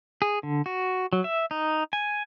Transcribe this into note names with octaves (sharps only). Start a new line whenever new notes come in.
G#4
D3
F#4
F#3
E5
D#4
G#5